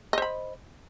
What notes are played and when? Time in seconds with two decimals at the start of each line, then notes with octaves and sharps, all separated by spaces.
0.13 D#5
0.18 C5
0.22 B5